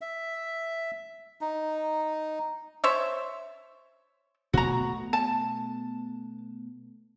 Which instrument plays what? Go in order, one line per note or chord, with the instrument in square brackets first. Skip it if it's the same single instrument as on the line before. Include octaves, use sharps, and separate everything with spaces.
[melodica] E5
D#4
[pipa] C5 C#5 E5
[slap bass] B2 A3 B3 [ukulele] F#4 A#5
[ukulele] A5